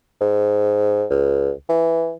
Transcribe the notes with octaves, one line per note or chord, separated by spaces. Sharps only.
G#2
C#2
E3